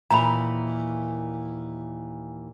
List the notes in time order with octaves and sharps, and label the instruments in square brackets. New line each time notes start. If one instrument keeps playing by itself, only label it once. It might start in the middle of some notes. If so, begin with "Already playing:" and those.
[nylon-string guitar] D#2 A#2 E3 [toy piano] A#5 B5